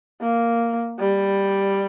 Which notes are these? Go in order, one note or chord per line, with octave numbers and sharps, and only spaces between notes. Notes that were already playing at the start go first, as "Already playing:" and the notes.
A#3
G3